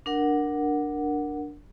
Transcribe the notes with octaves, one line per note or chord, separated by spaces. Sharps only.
D4 A#4 F#5